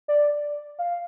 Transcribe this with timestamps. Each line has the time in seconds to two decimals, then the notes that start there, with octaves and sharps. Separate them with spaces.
0.08 D5
0.79 F5